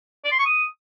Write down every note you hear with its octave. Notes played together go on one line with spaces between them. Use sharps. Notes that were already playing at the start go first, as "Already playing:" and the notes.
D5
C6
C#6
D#6